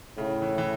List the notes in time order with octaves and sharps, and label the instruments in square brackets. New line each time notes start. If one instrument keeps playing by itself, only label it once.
[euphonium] A2 [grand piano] C#3
[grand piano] E3
E3